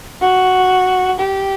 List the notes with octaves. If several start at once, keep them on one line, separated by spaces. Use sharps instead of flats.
F#4
G4